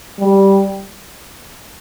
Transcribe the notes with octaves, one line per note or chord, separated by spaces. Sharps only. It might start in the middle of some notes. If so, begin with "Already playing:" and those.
G3